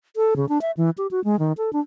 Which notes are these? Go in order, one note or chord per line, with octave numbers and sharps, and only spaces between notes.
A4
C#3
D4
E5
E3
G4
F#4
G#3
D#3
A4
D4